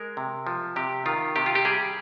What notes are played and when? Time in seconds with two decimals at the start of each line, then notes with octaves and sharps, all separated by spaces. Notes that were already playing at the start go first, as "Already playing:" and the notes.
Already playing: G#3 A#4
0.17 C3
0.47 F3
0.76 C3 G4
1.06 D#3 F4
1.36 C3 G4
1.46 F4
1.55 G4
1.65 G3 G#4